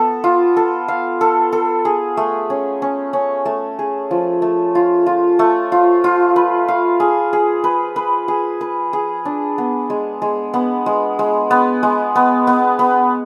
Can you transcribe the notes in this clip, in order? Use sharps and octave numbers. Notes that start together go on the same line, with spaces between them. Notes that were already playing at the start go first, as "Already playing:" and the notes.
Already playing: B3 A4
F4
A4
F5
A4
A4
G#4
A3
C#4
C#4
C#4
A3
G#4
F3
A3
F4
F4
A3
F4
F4
B4
F5
G#4
G#4
B4
B4
G#4
B4
G#4
D4
B3
G#3
G#3
B3
G#3
G#3
B3
G#3
B3
B3
B3